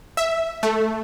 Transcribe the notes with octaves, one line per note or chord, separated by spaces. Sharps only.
E5
A3